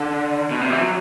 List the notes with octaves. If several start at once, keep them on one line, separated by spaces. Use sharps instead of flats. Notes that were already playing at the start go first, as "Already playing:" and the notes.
Already playing: D3
B2
C3
E3
F#3